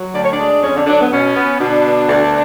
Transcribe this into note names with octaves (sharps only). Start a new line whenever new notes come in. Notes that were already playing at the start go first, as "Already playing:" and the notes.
Already playing: F#3
D2 D5
C#5
D4 D5
G#3
F2 C#4 C#5
D3 D4
D3 F#3 D4
B3
B2 C#4
B3
B2 D3 D4
B3
D2